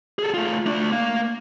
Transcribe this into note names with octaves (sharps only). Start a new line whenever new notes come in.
G#4 A4
A3 F4
A3 D4
A#3